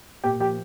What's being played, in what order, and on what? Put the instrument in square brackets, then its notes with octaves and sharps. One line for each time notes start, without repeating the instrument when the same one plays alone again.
[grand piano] A#2 G4 G5
F3 G4 G5